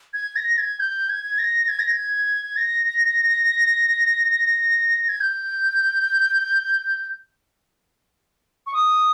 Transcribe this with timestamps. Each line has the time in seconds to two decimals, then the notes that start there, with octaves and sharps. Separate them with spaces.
0.14 G#6
0.36 A#6
0.54 A#6
0.58 G#6
0.80 G6
1.09 G#6
1.39 A#6
1.68 G#6
1.79 A#6
1.90 G#6
2.57 A#6
5.09 G#6
5.21 G6
8.67 C#6
8.73 D#6